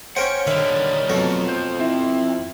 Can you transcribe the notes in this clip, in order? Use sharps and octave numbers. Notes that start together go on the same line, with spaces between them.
C#4 A#4 C5 C#5 F#5 G5
D3 D#3 G3 E5 F5
F2 B2 F#3 A3 A#4
C5
C4 E4